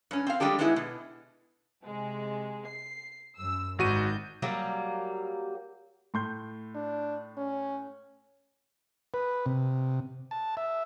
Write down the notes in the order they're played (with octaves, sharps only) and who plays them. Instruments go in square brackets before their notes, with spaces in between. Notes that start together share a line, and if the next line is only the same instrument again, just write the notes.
[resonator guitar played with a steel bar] G2 C#4
C4 F5
G3 G#3 D4 G4 A4
G#3 A3 B3 D#4 E4 G#4
B2
[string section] C3 G#3
C7
F#2 E6
[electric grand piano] G#1 F#4 D#7 [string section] G#2 D#3 G6
[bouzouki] F#3 G3 A#3
[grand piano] A2 C6 G6
[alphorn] D4
C#4
[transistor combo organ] B4
C3
A5
E5